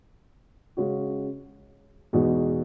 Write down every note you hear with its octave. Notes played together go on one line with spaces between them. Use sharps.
C#3 G#3 C#4 F#4
E2 B2 G#3 D#4 F#4